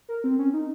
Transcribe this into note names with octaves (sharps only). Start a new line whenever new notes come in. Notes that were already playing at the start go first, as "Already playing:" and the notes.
A#4
C4
C#4
D#4